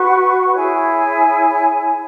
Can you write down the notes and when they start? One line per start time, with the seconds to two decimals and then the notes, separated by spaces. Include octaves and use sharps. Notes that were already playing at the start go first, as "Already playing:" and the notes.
Already playing: F#4 B4 F#5 C#6
0.54 E4 G#4 C#5 G#5